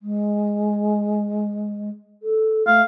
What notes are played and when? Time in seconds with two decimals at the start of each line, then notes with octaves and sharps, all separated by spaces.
0.02 G#3
2.23 A4
2.67 A3 F5